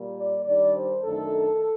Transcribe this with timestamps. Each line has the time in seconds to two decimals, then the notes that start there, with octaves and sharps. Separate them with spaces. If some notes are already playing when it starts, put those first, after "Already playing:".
Already playing: A#2 G3 A#3
0.16 D5
0.45 D#3 G3 D4 D5
0.75 C5
1.02 F#2 D#3 A3 D4 A4